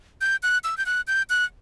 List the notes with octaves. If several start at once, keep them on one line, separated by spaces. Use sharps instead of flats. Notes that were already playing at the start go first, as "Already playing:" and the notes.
G6
F#6
E6
G6
F#6
G6
F#6